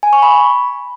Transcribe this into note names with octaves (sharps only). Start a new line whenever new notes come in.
G#5
C#6
B5